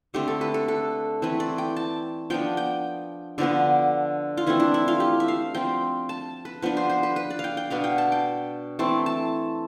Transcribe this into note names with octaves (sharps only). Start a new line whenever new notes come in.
D3 A3 C4 G4
A4
B4
A4
A4
E3 A3 C4 B4
D5
G5
A5
F3 B3 D4 G5
G5
D3 F3 B3 D4 D5
F4
E3 A3 C4 E4
D4
E4
F4
G4
E5
F5
F3 C4 G5
A5
B4
F3 B3 D4 B4
C5
C5
B4
B4
D5
F5
G5
G5
B2 B3 D4 F5
G5
A5
G5
E3 A3 C4 A5
A5